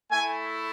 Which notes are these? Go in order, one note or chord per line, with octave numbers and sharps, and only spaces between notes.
A3 E4 G#5